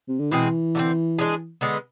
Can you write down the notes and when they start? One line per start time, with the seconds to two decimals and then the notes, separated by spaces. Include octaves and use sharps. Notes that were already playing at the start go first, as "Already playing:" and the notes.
0.09 C3
0.20 D3
0.32 B2 E3 G#3 C4 G#4
0.75 D3 A3 C4
1.18 G#3 D4 G#4
1.61 D3 G#3 B3